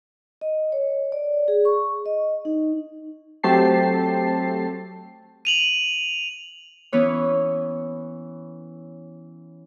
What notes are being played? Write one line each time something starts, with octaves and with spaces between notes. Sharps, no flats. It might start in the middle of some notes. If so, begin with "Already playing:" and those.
D#5
C#5
D5
G#4
C#6
D#5
D#4
F#3 A3 C4 G4 A5 C7
D#7 F7 F#7
E3 B3 C#4 B4 C#5